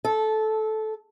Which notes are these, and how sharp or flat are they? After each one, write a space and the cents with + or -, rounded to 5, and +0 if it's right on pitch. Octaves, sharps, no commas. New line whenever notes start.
A4 -15